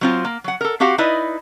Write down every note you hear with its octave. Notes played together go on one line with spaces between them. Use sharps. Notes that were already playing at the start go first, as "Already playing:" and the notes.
F#3 C4 F4
A#3
F#3 F#5
A4 A#4
C4 F#4 G4 F5 F#5
D#4 E4 B4 D5 D#5